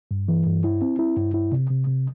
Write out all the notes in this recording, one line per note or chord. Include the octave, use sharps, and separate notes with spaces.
G2
E3
G2
E4
C4
E4
G2
E4
C3
C3
C3